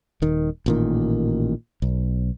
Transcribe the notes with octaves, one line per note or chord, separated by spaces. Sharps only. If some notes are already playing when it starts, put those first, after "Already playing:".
D#1 D#3
A1 A#2 D#3
B1